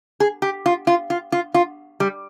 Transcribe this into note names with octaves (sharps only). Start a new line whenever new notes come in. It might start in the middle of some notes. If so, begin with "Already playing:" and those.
G#4
G4
F4
F4
F4
F4
F4
G3